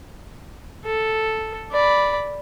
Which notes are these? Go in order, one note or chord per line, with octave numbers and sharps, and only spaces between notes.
A4
D5 B5